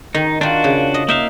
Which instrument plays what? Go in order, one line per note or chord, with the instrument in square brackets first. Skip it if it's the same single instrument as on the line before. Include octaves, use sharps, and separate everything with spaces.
[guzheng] D#3 [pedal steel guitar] D#4
[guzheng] D#3 F4 [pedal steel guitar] D4 F#4
[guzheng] C#3
D#5
[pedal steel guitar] A#3 E5 F5 [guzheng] D#4